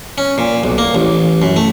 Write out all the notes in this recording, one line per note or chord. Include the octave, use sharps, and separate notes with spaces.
C#4
A#2
B1
A#3
A1
F#2
A3